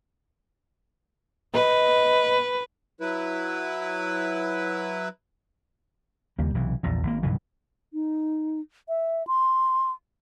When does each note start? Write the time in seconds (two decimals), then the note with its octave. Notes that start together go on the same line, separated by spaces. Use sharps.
1.54 B4 D#5
3.00 F#3 E4 B4
6.39 D#2 C#3 G3 A#3
6.54 B1 C3 E3
6.83 A#1 E2 A#2
7.03 G#1 A#3
7.23 B1 G2 C#3 E3
7.93 D#4
8.89 E5
9.27 C6